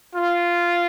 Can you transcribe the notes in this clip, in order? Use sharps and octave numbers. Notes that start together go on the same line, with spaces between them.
F4